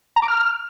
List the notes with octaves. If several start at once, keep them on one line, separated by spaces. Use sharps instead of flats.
A#5
D6
F6